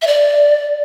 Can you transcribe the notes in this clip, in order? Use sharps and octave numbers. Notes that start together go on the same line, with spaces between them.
E5
D5